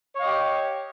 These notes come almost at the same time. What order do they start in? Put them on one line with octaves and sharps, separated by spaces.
C#5 F5 D#5 G4